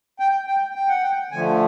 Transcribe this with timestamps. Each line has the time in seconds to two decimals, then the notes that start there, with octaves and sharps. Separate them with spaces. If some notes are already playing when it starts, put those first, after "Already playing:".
0.20 G5
0.47 G5
0.75 G5
0.88 F#5
1.03 G5
1.31 D3 F3 A3 G#5